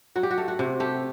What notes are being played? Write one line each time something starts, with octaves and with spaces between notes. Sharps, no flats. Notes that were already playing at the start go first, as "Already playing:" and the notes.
F#3 F#4
G4
F#4
A3
F#4
C3
A3 G4